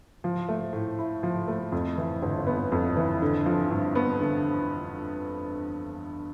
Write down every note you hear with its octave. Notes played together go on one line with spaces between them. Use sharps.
F3
A3
A2
E4
F3
A3
F2
E3
G1
B3
F2
E3
D3
F3
G2
B3
D3